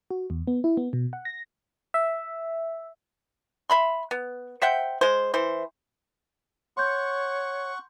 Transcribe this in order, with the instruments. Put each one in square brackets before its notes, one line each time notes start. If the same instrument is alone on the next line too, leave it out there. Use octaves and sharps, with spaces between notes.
[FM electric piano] F#4
E2
B3
E4
B3
B2
F#5
A#6
E5
[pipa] E5 B5 C6
B3
C5 E5 F#5 G5
G#3 C5
E3 C5
[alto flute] C#5 [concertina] F#5 C#6 [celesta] C6 G6